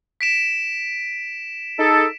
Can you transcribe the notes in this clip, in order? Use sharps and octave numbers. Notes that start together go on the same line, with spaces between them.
B6 D7 E7
D#4 G#4 A4